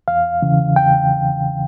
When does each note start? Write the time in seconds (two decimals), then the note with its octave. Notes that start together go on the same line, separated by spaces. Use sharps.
0.08 E2 F5
0.42 C#3 E3
0.76 E2 G5